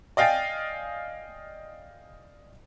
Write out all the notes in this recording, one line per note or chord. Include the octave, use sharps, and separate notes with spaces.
D5 D#5 F5 G5 G#5 A6